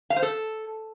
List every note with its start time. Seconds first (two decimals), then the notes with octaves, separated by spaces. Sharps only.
0.10 F5
0.16 C5
0.22 A4